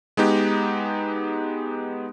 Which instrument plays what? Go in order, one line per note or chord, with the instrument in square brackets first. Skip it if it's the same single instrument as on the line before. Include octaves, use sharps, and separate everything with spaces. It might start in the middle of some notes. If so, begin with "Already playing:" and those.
[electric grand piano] G#3 B3 D#4 G4